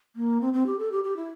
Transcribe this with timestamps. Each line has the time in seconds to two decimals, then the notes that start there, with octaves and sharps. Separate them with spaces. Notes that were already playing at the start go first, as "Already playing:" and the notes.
0.16 A#3
0.41 C4
0.53 C4
0.66 G4
0.79 A4
0.91 G4
1.04 G4
1.17 E4